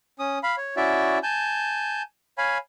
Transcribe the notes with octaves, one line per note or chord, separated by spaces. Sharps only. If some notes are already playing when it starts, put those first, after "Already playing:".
C#4 D#6
F5 B5
C#5
C#4 E4 F#4 D5 E5
G#5 A5 G6
C#5 F5 G#5 B5